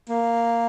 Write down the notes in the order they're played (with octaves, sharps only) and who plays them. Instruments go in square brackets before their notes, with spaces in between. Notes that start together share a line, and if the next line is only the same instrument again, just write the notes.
[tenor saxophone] A#3